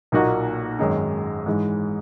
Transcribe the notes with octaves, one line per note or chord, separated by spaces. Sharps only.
B1 A#2 A#3 D#4 F#4
G#1 F#2 D#3 G#3 D#4
G#2 E3 G#3